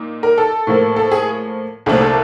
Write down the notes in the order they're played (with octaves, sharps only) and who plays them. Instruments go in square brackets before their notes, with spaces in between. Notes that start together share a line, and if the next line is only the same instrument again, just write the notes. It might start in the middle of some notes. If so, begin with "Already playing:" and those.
Already playing: [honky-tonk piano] A#2 D#4
A#4
A4
A2 F3 A#3
A4
G#4
C2 A#2 F3 A3 D4 G#4
A4